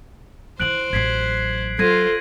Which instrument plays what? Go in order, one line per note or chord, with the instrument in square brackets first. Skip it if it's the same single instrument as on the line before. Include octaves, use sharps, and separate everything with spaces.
[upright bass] D#3 E3 [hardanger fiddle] C5 [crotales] F#6 D7 F#7
[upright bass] A1 F#3 [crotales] G#6 B6 C7
[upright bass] F#3 [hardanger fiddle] F4 C5 [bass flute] A4 [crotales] G#6 A#6 D#7